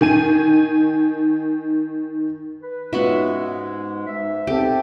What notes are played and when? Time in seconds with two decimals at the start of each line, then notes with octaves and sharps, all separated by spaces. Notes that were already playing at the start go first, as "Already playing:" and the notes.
0.01 D#3 G#5 D#7
2.61 B4
2.93 G#2 G#3 B3 C#4 F4 F#4 E5
4.07 G#2 E5
4.47 B3 C4 G4 A4